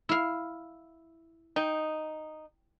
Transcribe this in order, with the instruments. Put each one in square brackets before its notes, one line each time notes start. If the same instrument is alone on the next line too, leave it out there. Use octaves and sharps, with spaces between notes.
[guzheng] E4 F5
[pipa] D#4 [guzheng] G5